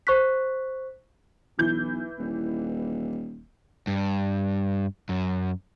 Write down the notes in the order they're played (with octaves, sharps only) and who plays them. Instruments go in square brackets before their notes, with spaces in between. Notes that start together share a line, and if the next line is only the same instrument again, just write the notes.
[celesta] C5 C#6 F#6 B6
[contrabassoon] B1 [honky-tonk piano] E3 G6
[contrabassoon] D#1
[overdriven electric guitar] G2
F#2